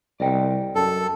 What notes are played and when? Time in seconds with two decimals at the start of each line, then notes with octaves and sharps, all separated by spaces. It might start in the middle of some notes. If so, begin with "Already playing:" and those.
0.20 C2 D5 D#5 G5
0.75 F#2 A4